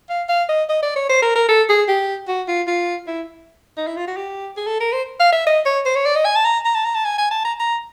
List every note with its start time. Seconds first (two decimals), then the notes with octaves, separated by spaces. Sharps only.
0.10 F5
0.29 F5
0.49 D#5
0.69 D#5
0.83 D5
0.96 C#5
1.09 C5
1.22 A#4
1.35 A#4
1.49 A4
1.69 G#4
1.88 G4
2.28 F#4
2.48 F4
2.68 F4
3.07 E4
3.78 D#4
3.87 E4
3.97 F4
4.07 F#4
4.17 G4
4.57 G#4
4.67 A4
4.80 A#4
4.93 C5
5.20 F5
5.33 E5
5.47 D#5
5.66 C#5
5.86 C5
5.96 C#5
6.06 D5
6.16 D#5
6.25 G#5
6.36 A5
6.45 A#5
6.65 A#5
6.75 A5
6.85 A#5
6.95 A5
7.05 G#5
7.18 G#5
7.31 A5
7.45 A#5
7.60 A#5